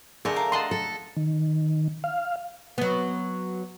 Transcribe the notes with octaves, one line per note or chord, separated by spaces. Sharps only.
D3 A3 D4 G4 G#4 A#4
F5 A#5
D#5 F#5 A5 C6
A4
D#3
F5
F#3 B3